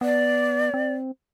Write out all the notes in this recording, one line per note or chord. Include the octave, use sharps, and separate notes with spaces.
B3 D5
C4